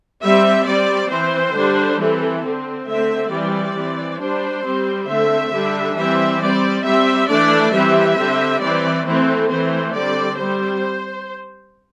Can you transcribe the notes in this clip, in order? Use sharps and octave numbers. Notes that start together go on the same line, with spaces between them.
G3 C4 E5
G3 C4 D5
E3 C4 C5
D3 G3 D4
E3 C4 A4
D3 C4
D3 A3 C4 E5
E3 G3 C4 D5
E3 C4
G3 D4 C5
G3 C4
D3 A3 C4 E5
D3 G3 D4
E3 G3 C4 E5
G3 C4 D5
G3 C4 E5
E3 A3 D4 D5
E3 G3 C4 E5
D3 G3 C4
E3 C4 D5
E3 A3 C4 A4
E3 A3 C4 C5
D3 G3 C4 D5
G3 C4 C5